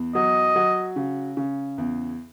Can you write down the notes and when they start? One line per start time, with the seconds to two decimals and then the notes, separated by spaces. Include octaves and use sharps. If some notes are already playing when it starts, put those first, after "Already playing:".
Already playing: E2
0.15 F#3 D#5
0.56 F#3
0.96 C#3
1.37 C#3
1.78 E2